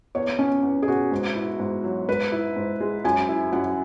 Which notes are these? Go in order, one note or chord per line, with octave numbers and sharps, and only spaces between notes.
E2 C#5
B3 C#4
E2
G#4
B2 F#4
G#2
E4
G#2
F#3
G#2 B4
E4
G#2
G#3
F#2 G#5
E4
F#2 F#5